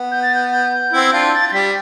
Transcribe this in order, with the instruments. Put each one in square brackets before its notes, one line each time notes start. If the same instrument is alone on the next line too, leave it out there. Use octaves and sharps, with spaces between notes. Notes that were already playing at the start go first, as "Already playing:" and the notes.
Already playing: [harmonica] B3
[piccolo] G6
A6
G6
G6
[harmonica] C4 E4
D4 F4
[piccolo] A6
A6
[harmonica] G3 [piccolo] B6